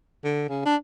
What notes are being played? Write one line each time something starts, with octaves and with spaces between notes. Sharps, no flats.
D3
C#3
D4